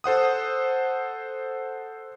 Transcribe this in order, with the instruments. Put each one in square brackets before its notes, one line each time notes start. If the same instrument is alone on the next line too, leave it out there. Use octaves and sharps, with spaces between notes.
[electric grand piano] A4 C5 F#5 D#6